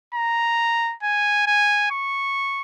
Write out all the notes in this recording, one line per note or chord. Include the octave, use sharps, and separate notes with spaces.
A#5
G#5
G#5
C#6